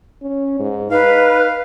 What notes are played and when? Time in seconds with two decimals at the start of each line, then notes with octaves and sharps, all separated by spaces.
0.22 C#4
0.59 G#2
0.91 D#4 B4 F5